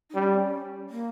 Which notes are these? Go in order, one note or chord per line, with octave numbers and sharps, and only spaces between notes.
D#4
G3 C#4
C4
C#4
A#3